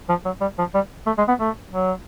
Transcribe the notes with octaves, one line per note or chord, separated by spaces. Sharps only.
F3
F#3
G3
F3
G3
A3
G#3
B3
A3
F#3